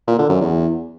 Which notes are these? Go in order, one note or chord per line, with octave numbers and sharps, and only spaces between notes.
A#2
D3
F#2
E2